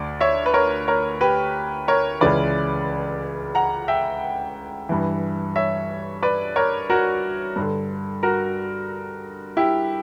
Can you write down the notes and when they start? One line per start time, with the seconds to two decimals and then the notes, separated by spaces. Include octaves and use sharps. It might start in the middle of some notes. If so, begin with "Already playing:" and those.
Already playing: D2 D5
0.20 C#5 E5
0.46 B4
0.53 A#4 C#5
0.88 A#4 C#5
1.21 G4 B4
1.88 A#4 C#5
2.21 C#2 C#3 E3 B4 D5
3.55 F#5 A#5
3.88 E5 G5
4.89 G2 E3
5.56 C#5 E5
6.22 B4 D5
6.56 A#4 C#5
6.90 F#4 A#4
7.56 G2 D3
8.23 F#4 A#4
9.57 E4 G4